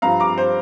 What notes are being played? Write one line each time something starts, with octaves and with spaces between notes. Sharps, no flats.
G2 F3 F5 A#5
A#5 D6
C5